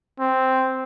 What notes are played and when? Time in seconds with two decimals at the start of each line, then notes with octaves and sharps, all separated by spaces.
0.20 C4